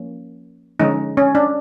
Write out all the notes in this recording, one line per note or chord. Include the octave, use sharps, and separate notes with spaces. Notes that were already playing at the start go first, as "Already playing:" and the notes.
Already playing: F3 A#3 C#4
D3 F3 G#3 C#4 D#4
C#4
D4